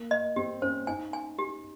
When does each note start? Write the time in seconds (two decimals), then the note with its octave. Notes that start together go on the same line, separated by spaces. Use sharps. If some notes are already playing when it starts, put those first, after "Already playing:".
Already playing: A#3
0.11 D#5
0.36 C4 G4
0.62 C#4 C5
0.87 D#4 G#5
1.13 G#5
1.39 G4